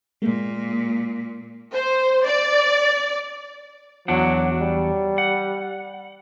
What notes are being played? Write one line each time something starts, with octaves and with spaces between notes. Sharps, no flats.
A#2 G#3 A#3
C5
D5
E2 F#3 D4 F#5
G3
F#5